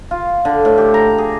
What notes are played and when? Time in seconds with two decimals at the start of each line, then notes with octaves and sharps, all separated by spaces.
0.11 F4
0.45 D3
0.65 A2
0.78 G4
0.94 A#5
1.18 G#4